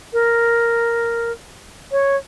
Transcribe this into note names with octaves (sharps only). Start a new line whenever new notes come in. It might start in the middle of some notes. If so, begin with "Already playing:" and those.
A#4
C#5